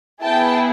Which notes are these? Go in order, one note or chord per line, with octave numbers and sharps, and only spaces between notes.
B3 E4 G#4 G5 A5